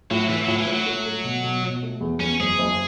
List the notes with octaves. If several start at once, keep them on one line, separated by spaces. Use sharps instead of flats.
A2 F#3
A2 E3
A2 F#3
E3
A2
F#3
A3
A3
B2
B2
B2
A3
E2
E2 C#4
F#1 G#4
F#1